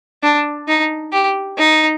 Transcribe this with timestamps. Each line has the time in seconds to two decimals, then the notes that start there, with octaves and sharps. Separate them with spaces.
0.23 D4
0.68 D#4
1.13 G4
1.58 D#4